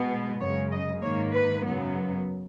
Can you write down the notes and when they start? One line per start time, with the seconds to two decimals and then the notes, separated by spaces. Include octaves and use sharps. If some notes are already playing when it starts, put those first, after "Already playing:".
Already playing: B2 G#3 B3
0.40 F#2 C#3 G#3 C#5
0.72 D#5
1.01 G#2 D#3 A#3 C#5
1.33 B4
1.64 F#2 C#3 F#3 B3